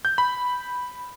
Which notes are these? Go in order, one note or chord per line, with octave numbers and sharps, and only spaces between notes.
G6
B5